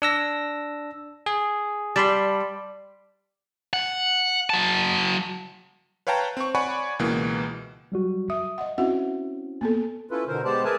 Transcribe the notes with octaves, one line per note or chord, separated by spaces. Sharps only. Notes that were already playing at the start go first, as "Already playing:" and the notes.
D4 E6 A#6
G#4
G3 A5 B5 C6
F#5
F#3 A5
B4 C#5 F5 G5 A5 A#5
C4 C#6
C#5 D5 F#5 G#5 B5 C#6
C#2 B2 E3 A#3
F#3 G3 F#4
E5 D#6
D#5 F#5
C4 C#4 E4 F#4 E5 F#5
A#3 B3 A4
C#4 E4 F4 A4 B4
B2 D3 A#4 C5
G#3 B3 G4 C5 D5 A5
G#4 A#4 B4 E5 G#5 A5